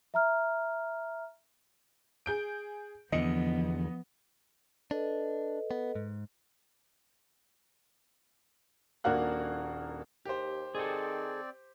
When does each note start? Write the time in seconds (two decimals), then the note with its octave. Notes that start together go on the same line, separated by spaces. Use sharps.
0.14 E5 A#5 F6
2.26 G#4 G6 D7
3.12 E2 D3 F3 B3 D#5
4.91 D4 A4 B4 D#5
5.71 B3
5.95 G#2
9.04 D#1 A#3 D4 F#4 F5 F#6
10.25 D#2 G4 C5
10.75 D#3 C4 G#4 A4 D5